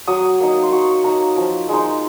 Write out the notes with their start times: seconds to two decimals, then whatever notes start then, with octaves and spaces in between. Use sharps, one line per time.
0.07 F#3 D#6
0.40 A#3 D#4
0.63 C6
0.72 F#3 C#6
1.04 A#3 D#4 A#5
1.36 F3
1.69 G#3 D#4